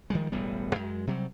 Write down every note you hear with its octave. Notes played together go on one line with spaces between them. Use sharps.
D#3 F3 G3 G#3
E1 A1 G3 B3
F#2 G#3
C3 F#3 G3